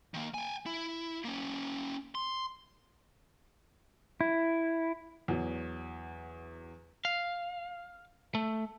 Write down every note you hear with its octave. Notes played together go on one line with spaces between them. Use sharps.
D#3 A#3
G5 G#5
E4
A#3 C#4
C6
E4
E2 F#3
F5
A3